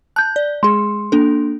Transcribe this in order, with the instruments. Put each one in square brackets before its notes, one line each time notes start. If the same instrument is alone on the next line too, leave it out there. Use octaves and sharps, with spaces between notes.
[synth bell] A5 [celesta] F#6 G6
[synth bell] D5
[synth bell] G#3 G#4 [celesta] C6
[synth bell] A#3 D4 A4